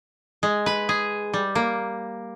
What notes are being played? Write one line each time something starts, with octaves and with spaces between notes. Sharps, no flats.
G#3
B4
G#4
G3
A#3